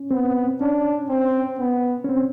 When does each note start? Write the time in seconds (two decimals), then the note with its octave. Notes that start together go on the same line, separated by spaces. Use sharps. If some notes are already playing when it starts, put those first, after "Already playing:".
Already playing: C#4
0.11 B3 C4
0.60 C#4 D4
1.10 C4
1.59 B3
2.04 C#4
2.09 C4